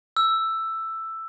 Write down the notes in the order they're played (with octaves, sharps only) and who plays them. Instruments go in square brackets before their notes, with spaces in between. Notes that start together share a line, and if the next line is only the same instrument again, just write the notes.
[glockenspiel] E6